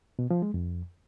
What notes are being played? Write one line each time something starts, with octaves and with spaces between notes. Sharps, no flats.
B2
F3
G#3
F2